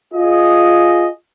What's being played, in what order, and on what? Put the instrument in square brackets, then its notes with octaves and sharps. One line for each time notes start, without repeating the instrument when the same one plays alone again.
[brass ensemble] F4 G#4 D#5